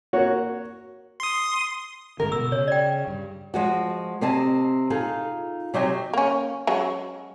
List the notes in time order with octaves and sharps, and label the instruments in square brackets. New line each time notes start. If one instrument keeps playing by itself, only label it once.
[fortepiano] A#3 F#4 C#5
[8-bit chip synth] C6 D#6
[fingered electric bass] G#2 B2 D3 [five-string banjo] A#4
[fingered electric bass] B2 [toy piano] E6
[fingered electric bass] C#3 [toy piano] C#5
[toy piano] D5 G5
[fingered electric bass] G2
[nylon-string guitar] F3 G#3 F#4
C3 C4 D#5 G#5 A5
D#4 F4 G#4 A4
C3 F#3 D#5 G5 G#5
[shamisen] A#3 C#4
F#3 G#3 C#4